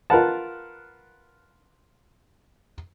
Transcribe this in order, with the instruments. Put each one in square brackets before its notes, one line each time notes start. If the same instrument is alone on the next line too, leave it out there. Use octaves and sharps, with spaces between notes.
[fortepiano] F4 A#4 B4 F#5 A5